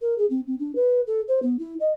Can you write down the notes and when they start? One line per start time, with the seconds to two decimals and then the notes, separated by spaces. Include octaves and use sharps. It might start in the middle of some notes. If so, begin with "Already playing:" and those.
0.02 A#4
0.18 G#4
0.30 C4
0.47 C4
0.59 D4
0.75 B4
1.07 A4
1.28 C5
1.43 B3
1.59 E4
1.80 D#5